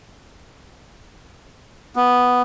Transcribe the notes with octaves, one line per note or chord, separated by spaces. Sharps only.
B3